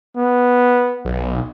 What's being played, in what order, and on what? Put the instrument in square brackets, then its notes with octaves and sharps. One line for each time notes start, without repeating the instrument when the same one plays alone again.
[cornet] B3
[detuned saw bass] B1